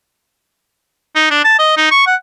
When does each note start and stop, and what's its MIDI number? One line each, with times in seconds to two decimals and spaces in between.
1.15 1.28 63
1.31 1.42 62
1.44 1.58 81
1.59 1.75 75
1.77 1.88 63
1.91 2.04 85
2.07 2.15 78